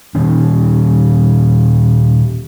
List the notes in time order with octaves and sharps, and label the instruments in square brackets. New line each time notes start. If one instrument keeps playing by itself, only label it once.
[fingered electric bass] A#2 D#3 C#4